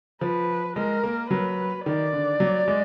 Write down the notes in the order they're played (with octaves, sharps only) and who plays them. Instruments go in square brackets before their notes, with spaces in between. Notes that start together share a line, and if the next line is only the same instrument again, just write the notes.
[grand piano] F3 [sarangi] B4
[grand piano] G#3 [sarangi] A#4
[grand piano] A#3
[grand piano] F#3 [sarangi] B4
[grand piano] D#3 [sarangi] D5
[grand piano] D3
F#3
G#3